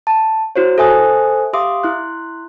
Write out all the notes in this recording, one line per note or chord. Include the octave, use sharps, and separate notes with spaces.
A5
E4 F#4 C5 C#5
A4 C5 E5 G#5 D#6 F#6
G4 E5 F5 C6 D6 D#6
E4 C6 F#6